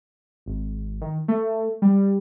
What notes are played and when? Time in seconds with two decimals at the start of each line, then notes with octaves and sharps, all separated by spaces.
0.46 G#1
1.01 D#3
1.28 A3
1.82 G3